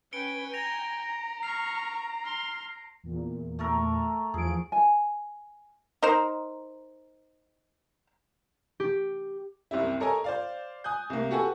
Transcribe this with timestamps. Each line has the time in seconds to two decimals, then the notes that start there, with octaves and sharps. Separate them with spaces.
0.13 C#4 B4 G5 G#5 C#7 D7 G7
0.54 A#5 A#6 F7
1.43 C#6 F6 C7
2.24 C6 F6
3.04 E2 A#2
3.59 A3 A4 A#4
4.34 E2 F3 G#4 D7
4.72 G#5
6.03 D#4 A#4 C5
8.80 G4
9.71 F#1 C2 C3 G3 E4
10.00 A4 A#4 C#5 D#5 G#5
10.24 C5 D5 F5
10.84 G#5 D#6 F#6 G6
11.10 C2 A#3
11.31 F#4 G4 A4 B4 F#5 G#5